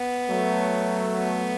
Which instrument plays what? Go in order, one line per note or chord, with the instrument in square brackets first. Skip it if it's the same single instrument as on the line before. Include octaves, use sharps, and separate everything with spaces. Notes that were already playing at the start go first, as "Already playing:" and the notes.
Already playing: [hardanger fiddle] B3
[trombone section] F#3 A3
[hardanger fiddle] B3